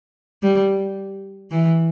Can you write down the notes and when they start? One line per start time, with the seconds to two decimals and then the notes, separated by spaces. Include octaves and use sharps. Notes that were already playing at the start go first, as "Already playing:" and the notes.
0.43 G3
1.51 E3